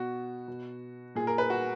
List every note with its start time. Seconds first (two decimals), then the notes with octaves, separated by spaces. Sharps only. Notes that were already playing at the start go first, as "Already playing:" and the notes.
Already playing: B2 F#4
0.48 B2
1.15 A#2 G#4
1.27 A#4
1.38 B4
1.50 F#4